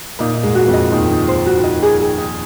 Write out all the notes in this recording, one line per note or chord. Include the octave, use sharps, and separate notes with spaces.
A#2 A#3 D#4
D#4
G#2 G#3
F#4
F2 F3
D#5
D#2 D#3 D#4
D#4
C5
F#4
D#5
G#4
G#4
D#4